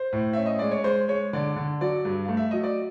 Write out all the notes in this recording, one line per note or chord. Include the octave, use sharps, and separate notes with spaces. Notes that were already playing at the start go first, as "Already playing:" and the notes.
Already playing: C5
A2
C#4 E5
D#5
G#3 D5
C#5
G#3 C5
G#3 C#5
D3 D5
D3
F#3 D5
G2
A3 F5
E5
F#3 D#5
D5